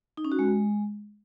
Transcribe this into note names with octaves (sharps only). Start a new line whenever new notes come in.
D#4
C#4
F#4
G#3